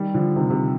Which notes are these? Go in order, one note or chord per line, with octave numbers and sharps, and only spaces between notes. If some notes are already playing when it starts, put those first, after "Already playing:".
Already playing: D#3 G3
D3 F3
C3 D#3
C3